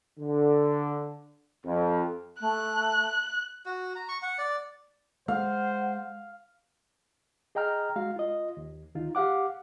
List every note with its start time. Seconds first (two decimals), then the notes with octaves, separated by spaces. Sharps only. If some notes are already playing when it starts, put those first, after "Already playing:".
0.19 D3
1.65 F2
2.40 A3 F#6
3.66 F#4
3.95 A#5
4.08 C#6
4.22 F#5
4.38 D5
5.28 G#3 C5 F5 F#5
7.55 G#4 D#5 G5 A#5 F6
7.96 G#3 F#4 F5
8.16 F4 D#5
8.57 D#2
8.95 D2 D#3 D#4 F4
9.15 G4 F5 F#5 D6